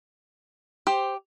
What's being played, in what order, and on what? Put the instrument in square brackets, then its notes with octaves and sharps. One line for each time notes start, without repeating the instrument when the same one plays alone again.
[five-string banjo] G4 C5